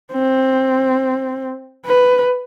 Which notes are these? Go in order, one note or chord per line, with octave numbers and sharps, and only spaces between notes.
C4
B4